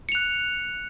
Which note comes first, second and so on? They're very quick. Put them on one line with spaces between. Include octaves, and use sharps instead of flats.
C#7 F7 F#6